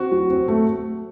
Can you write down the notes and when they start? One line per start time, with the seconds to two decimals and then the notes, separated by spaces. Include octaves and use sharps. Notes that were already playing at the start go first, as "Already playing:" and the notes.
Already playing: C4 F#4
0.11 F#3
0.30 C4
0.48 A3